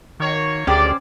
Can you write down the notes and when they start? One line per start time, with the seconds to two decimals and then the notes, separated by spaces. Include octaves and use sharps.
0.20 D#3 A#3 F#4 C#5
0.67 D2 D#3 G#3 C#4 G4 C5 D5 D6